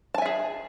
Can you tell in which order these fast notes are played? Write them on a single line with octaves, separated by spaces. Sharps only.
A5 G#5 E5 G#4